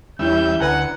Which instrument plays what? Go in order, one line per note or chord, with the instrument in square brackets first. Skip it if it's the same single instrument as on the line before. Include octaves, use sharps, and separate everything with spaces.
[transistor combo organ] E2 G3 E5 [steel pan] C#4 E4 [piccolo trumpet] G6
[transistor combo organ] D2 [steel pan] B4 G#5 A#5 [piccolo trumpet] F#5